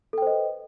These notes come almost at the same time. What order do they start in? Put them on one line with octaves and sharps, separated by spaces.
A4 G5 C5 D#5 B4